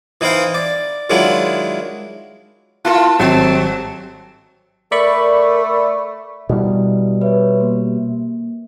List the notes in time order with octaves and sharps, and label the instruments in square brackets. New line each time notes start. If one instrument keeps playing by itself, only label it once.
[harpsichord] E3 D#4 E4 C5 F5 G5
D5
D#3 F#3 G#3 D4 E4 F4
[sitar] E4 F4 A#4 [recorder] A5
[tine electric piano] G#1 F#3 [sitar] G3 [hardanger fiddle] C4 [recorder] A5
[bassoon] A3 [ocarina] A#4 [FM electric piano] D5 B5 C#6
[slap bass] B2 G3 [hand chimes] E4 D#5
[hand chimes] B4 C#5 E5
A#3